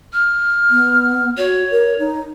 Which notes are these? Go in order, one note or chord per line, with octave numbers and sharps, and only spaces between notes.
F6
B3
F#4 C#5
A#4
D#4